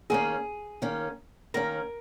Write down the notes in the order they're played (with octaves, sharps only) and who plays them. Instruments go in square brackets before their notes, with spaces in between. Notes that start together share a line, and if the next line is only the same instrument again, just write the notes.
[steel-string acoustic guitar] D#3 A#3 C#4 [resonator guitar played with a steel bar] G#4
[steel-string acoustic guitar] D#3 A#3 C#4
[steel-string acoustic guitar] D#3 A#3 C#4 [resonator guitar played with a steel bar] A#4